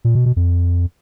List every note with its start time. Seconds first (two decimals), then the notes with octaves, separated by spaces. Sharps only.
0.05 A#2
0.15 B2
0.26 B2
0.36 F2